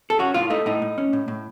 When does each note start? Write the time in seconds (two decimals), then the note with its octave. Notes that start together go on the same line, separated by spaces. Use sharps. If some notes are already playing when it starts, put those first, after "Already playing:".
0.10 A4
0.19 C#4 F#4
0.34 A2 F4
0.50 A3 D#4
0.66 A2 D#4
0.82 A2
0.98 C#4
1.13 A2
1.28 A2